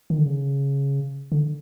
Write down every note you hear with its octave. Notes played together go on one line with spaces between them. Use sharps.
D#3
D3
C#3
D3